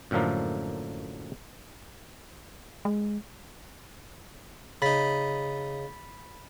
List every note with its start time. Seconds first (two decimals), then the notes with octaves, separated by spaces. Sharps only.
0.11 F#2 A2 D3 F3 A#3
2.85 G#3
4.82 C#3 D#4 B5 A6 B6